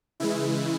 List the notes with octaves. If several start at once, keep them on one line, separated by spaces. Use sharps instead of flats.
C#3 E3 G#3 E4